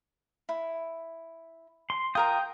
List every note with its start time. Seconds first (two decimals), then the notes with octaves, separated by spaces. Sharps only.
0.49 E4
1.90 C6
2.15 F4 A#4 G5 A#5 D#6